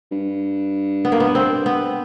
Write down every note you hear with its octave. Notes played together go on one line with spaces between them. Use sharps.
G2
B3
A#3
B3
C4
B3